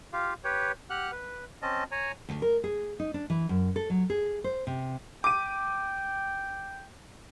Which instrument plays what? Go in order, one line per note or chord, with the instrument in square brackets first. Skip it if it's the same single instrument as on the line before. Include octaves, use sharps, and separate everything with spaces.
[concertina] F4 G4 F5
G4 B4 C#5 G5
G4 F#5 F6 F#6
B4
C4 C#4 D#5 A5
C#5 G#5 A#5
[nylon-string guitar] D2
A#4
G#4
D#4
D4
E3
F#2
A4
F#3
G#4
C5
C3
[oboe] G5 [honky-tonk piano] D6 D#7